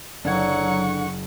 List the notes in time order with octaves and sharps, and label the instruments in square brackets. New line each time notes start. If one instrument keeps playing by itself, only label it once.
[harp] F#1 G#6 [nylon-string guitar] D3 D4 [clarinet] F#3 [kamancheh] F#5 C#6